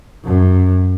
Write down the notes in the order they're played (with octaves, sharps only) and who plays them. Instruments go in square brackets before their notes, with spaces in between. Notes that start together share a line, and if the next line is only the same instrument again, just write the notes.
[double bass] F#2